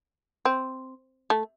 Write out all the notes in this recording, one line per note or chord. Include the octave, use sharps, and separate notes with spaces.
C4
A3